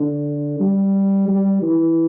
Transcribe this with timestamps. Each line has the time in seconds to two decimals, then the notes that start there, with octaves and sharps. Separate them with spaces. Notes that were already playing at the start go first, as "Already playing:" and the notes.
Already playing: D3
0.60 G3
1.28 G3
1.62 E3